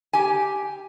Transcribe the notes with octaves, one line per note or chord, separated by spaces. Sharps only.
G4 G#5